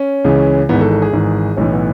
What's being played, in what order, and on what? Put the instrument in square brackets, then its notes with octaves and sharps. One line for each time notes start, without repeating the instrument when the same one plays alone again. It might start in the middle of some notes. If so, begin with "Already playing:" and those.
Already playing: [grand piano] C#4
C#2 C#3 E3
G#1 G#2 E3 B3
A4
A4
G#4
G#1 G#2 E3
B1 A2 E3 C#4
B3